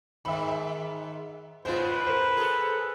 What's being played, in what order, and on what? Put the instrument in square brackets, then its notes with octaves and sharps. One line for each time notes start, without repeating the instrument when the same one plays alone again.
[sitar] G#2 D#3 [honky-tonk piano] E5 B5
[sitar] C#3 G#3 B3 [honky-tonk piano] F4 C5 [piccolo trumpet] B4
[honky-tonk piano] A#4 C5
[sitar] G#4 A4